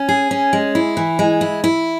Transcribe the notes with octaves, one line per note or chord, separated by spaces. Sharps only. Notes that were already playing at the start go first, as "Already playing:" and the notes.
Already playing: C#4
G#4
C#4
G#3
E4
E3
G#3
E4
E4